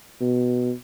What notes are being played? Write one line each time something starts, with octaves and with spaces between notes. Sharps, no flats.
B2